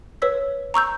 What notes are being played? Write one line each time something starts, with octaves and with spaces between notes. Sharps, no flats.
B4 C#5 E6 B6
A#5 C#6 E6 G6